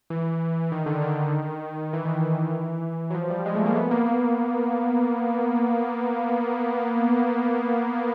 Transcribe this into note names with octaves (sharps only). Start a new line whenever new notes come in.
E3
D#3
D3
D#3
E3
D#3
E3
F#3
F3
G3
G#3
A3
A#3
B3
A#3
A#3